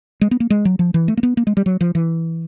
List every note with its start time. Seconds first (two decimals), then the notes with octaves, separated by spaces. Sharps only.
0.21 G#3
0.31 B3
0.40 A#3
0.50 G#3
0.65 F#3
0.79 F3
0.94 E3
1.08 A3
1.17 A#3
1.23 B3
1.37 A#3
1.47 G#3
1.57 G3
1.66 F#3
1.81 F3
1.95 E3